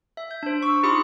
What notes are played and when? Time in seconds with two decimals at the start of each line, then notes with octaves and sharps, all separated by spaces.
0.17 E5
0.31 G6
0.43 D4 C5
0.62 C#6 E6
0.83 D#4 F4 G4 B5 C6 D#6